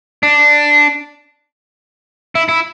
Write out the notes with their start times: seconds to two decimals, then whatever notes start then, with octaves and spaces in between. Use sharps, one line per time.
0.23 D4
2.35 E4
2.49 E4